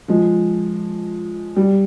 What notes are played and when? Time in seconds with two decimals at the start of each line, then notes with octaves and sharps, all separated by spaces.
0.08 F3 G#3
1.57 G3